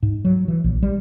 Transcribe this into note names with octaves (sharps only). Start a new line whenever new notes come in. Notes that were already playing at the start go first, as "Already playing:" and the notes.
G#2
F#3
E3
A#1
G3